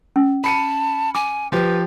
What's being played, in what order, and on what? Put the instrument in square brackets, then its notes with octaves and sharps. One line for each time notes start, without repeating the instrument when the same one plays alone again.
[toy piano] C#4
[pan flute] A5 [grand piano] B5 C#7 D#7
[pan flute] G#5 [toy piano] D6
[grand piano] F3 G4 [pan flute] B4